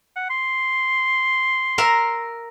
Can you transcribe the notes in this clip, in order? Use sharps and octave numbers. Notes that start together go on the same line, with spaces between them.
F#5
C6
A#4 E5 A#5